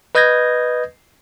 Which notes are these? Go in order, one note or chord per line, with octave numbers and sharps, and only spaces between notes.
B4 D#5 D#6 G6 G#6 A#6